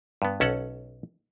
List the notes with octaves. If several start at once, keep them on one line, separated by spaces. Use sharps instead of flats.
G2 B3
B1 C#4 A4 F#5